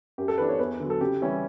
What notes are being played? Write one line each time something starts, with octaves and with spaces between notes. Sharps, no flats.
F#2 G4
A4
E3 B3 D4 B4
C#5
E2 B4
D3 F#3
A4
C#3 G4
E3 G3 C#4 E4